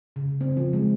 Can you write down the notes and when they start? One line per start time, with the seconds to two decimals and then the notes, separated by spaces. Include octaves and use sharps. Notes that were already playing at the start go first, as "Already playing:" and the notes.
0.16 C#3
0.41 C4
0.57 F3
0.73 G#3